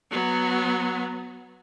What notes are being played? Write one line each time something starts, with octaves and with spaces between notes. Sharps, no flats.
F#3 B3